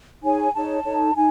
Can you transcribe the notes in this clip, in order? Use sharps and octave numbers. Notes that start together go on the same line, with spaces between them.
D#4 G#4 C#5 G#5
D#4 G#4 C#5 A5
D#4 A4 C#5
D#4 G#5